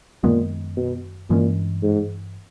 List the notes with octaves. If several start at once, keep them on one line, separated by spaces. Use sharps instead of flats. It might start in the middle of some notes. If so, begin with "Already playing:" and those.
F#2 A#2 D#3 G#3 B3
B2
G2 A#2 E3 G#3 C#4
G#2